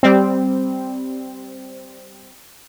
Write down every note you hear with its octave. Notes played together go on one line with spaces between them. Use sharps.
G3 C4